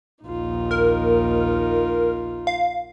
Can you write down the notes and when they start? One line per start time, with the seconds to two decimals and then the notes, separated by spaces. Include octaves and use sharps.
0.24 A#1 D#2 D#4 F4
0.71 A#4
2.47 F5